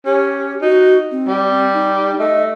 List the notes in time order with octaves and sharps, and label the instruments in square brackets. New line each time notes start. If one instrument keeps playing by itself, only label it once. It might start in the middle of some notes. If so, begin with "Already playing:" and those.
[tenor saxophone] C#4 [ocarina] G4
[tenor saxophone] D#4 [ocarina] F#4
[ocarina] C4
[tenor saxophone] G3
[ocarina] D#4
[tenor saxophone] A3 [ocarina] D#5